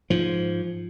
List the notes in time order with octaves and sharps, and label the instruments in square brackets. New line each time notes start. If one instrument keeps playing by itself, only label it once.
[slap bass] G#2 F3